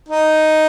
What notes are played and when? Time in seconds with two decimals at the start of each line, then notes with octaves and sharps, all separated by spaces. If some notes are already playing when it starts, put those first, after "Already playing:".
0.09 D#4